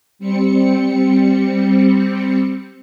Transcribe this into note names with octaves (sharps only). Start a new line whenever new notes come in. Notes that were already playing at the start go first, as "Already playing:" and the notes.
G3 C4 C#7